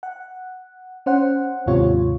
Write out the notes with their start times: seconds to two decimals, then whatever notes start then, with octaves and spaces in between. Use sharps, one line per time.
0.03 F#5
1.06 C#4 C5 F#5
1.66 D#2 G#2 C3 F4 C#5